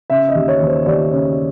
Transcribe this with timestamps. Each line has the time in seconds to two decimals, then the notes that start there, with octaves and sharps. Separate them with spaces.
0.10 C#3 E5
0.29 D#5
0.35 D#2
0.48 C#5
0.61 D#2
0.67 C5
0.86 D#2 D5
1.12 C#3 C#5